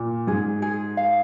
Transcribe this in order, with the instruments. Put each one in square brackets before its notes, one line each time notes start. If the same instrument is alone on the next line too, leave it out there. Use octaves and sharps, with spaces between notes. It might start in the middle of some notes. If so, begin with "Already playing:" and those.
Already playing: [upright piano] A#2
[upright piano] G#2 [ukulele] G#4
[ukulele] G#4
F5